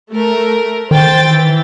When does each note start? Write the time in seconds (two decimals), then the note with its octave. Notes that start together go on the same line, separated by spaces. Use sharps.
0.12 A3 A#4
0.91 D#3 C5 G5 A6
1.28 E3